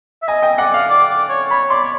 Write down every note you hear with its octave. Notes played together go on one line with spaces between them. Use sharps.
E5
D#5 G#5
G5
D5 F#5
F5
D5
D5
C#5
C#5 B5
D5 C6
C#5